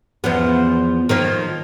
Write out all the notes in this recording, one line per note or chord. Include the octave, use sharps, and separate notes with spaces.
E2 F3 B3
D#3 F3 A#3